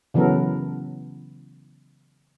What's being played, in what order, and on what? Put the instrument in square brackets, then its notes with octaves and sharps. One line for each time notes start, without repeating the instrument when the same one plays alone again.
[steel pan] C#3 E3 F#3 B3 A4 A#4